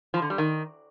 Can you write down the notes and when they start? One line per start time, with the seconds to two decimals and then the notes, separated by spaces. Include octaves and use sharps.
0.14 F3
0.22 D3
0.30 G3
0.38 D#3